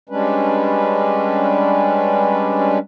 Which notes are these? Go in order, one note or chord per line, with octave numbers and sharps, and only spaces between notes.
G3 G#3 C#4 D4 B4